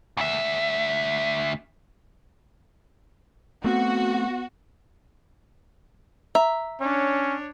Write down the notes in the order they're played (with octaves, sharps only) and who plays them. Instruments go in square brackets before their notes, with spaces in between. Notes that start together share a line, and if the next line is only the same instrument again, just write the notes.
[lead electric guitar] D2 E5
[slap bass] A3 C4 [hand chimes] B3 [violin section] F#4
[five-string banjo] E5 [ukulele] A#5
[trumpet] C#4 [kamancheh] D4 C#5